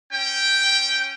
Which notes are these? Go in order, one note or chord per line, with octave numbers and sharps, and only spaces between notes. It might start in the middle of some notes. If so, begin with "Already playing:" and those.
C#4 G5